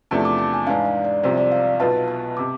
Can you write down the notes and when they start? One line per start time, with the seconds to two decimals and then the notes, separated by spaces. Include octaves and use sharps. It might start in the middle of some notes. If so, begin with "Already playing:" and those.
0.11 E2 C3 F3 A3 D4 A5
0.25 D6
0.39 A5
0.54 G#5
0.67 G#2 E3 G#3 D4 F5
0.85 D5
1.05 D5
1.23 C2 C3 F3 C5
1.38 D5
1.52 F5
1.80 B1 B2 B3 F4 B4 A5
2.08 A5
2.37 C3 D6